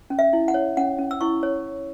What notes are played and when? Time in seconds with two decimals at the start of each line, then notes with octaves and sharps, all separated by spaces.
0.10 C#4
0.19 E5
0.33 E4
0.48 F#5
0.54 C#5
0.77 C#4 F#5
0.98 C#4
1.11 E6
1.21 E4 C#6
1.43 C#5